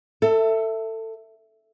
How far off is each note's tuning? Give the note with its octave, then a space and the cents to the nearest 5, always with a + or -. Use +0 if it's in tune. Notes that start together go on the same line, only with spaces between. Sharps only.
A4 +25 E5 +0